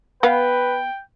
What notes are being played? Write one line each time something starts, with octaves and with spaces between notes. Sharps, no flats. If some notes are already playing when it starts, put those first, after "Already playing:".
B3 B4 F5 G5